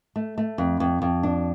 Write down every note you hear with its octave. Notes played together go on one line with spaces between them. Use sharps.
A3
A3
F2
F2
F2
D4